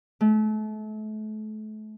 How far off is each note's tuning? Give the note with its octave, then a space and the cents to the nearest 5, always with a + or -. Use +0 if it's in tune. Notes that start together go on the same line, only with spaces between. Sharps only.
A3 -35